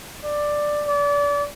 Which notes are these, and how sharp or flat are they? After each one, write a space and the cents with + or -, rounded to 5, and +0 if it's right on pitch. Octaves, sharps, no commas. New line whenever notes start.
D5 +10
D5 -30